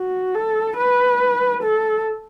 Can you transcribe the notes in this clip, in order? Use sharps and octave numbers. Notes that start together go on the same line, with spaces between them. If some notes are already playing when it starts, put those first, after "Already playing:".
Already playing: F#4
A4
B4
A4